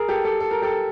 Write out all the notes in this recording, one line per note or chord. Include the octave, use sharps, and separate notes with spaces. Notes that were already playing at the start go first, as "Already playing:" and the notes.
Already playing: G#4 A#4
G4 A4
G4 A4
A4
A#4
G4 A4